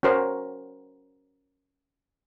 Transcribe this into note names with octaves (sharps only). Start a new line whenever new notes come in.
C#4 F#4 A#4 C5